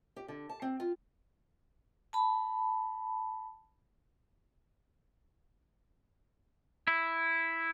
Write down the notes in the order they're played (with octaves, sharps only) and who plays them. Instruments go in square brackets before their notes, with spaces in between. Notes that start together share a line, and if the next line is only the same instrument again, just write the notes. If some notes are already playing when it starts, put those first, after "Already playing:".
[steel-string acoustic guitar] G4
D3
A5
C4
F4
[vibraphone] A5 B5
[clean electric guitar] E4